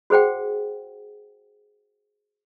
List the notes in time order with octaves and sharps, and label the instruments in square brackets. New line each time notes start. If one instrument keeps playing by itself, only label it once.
[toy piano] F#4 G#4 C5 F#5 G5